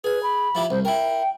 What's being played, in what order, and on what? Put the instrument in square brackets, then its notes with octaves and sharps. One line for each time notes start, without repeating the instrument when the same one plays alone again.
[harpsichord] G#4 G#5 [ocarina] B4
[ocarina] B5
[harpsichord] F3 E4 G4
[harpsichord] C2 [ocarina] C5
[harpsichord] E4 A#4 [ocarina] G5